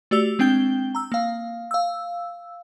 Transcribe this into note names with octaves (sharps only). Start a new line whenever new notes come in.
A3 F#4 G4 D5 E6 F7
G#3 C4 D4 G5 G6 G7
A#5 E6
A#3 F5
F5 E6